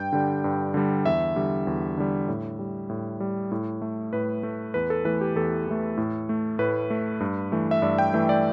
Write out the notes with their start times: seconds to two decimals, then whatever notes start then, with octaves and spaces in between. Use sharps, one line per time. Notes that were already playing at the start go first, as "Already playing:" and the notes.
Already playing: G2 G5
0.12 D3 G3
0.44 G2
0.74 D3 G3
1.06 E2 E5
1.36 D3 G3
1.67 E2
1.98 D3 G3
2.28 A2
2.59 G3
2.89 A2
3.20 G3
3.51 A2
3.82 A3
4.13 A2 B4
4.43 A3
4.74 E2 B4
4.90 A4
5.05 E3 A3 B4
5.21 G4
5.36 E2 A4
5.67 E3 A3
5.97 A2
6.29 A3
6.59 A2 B4
6.90 A3
7.20 G2
7.52 E3 A3
7.71 E5
7.82 G2 D5
7.99 G5
8.14 E3 A3 E5
8.29 D5